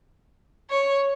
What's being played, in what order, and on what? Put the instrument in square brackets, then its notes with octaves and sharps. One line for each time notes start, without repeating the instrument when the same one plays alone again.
[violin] C#5